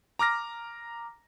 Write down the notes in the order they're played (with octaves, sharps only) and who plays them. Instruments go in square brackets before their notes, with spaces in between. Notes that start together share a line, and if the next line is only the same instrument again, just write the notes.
[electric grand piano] A#5 D6 F6 A#6